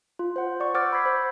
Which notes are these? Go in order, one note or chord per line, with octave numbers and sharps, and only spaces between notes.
F4
C5 F#5
D5 F#5 C#6
C5 F#5 D6 E6 F6 A6
B5 E6 G6 G#6 B6 C7
C5 G#6